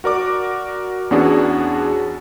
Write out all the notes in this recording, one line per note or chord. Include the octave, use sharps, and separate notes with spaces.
F#4 A#4 D5 D6
E2 B3 C#4 D4 F#4 G#4